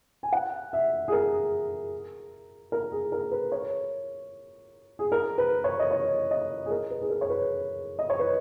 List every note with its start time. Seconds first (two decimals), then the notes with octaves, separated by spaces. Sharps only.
0.23 G#5
0.32 F#5
0.73 E5
1.08 G#4
1.12 A#4
2.72 A#4
2.92 G#4
3.12 A#4
3.31 B4
3.52 C#5
4.99 G#4
5.12 A#4
5.38 B4
5.64 C#5
5.79 D#5
5.91 C#5
6.31 D#5
6.66 G#4
6.70 A#4
6.90 B4
7.01 G#4
7.10 A#4
7.21 C#5
7.30 B4
7.99 D#5
8.10 C#5
8.19 B4